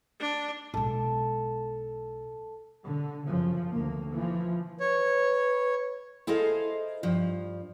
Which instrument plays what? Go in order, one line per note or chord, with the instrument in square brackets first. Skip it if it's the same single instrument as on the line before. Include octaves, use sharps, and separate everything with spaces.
[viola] D4
[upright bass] B1 G#3 [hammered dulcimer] A4
[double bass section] D3
F#2 C#3 F3
D2 A#3
E3 F3
[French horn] B4 [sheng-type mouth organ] C#5
[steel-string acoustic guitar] E4 G#4 A4 C5 D#5 F5
G2 F3